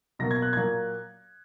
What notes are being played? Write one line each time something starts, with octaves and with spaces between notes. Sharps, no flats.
B2 F#3 A#3 A#6
G#6
F#6
A#2 F#3 A#3 G#6